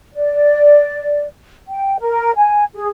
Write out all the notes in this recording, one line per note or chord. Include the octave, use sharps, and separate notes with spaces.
D5
G5
A#4
G#5
G#4